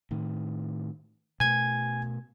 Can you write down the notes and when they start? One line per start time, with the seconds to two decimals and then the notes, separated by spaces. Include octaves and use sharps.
0.11 A2 D#3
1.40 B2 A3 G#5 G#6